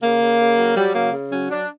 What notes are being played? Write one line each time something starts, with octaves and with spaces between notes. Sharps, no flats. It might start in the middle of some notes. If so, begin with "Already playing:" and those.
C#3 A#3
C#3
C#3
F#3
F#3 G3
C#3 A#3
C#3
F#3 C#4
F#3 D4